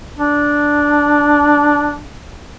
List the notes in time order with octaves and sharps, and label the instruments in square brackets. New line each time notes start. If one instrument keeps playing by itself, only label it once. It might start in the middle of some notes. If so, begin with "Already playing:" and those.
[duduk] D4